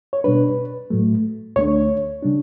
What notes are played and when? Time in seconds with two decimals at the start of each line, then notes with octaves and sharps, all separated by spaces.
0.13 C#5
0.24 B2 G3 D4 B4
0.90 A2 F#3 A3
1.56 D2 D3 A3 D4 C#5
2.23 C#3 G3 D4